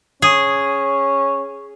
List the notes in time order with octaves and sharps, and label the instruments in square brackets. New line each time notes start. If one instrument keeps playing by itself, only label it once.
[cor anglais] C#4 [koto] G#4